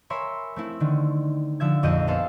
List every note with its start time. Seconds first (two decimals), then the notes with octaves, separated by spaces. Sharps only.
0.10 A#4 C#5 E5 G#5 B5 C6
0.56 A3 C4 E4
0.80 D3 D#3
1.60 D3 F3 E5 G#6
1.83 A#1 F2 D#5 G6 D#7
2.07 B3 G#4 A4 C5 E5 F5